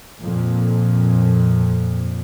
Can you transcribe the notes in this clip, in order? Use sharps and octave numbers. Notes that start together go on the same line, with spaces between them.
F2 A#2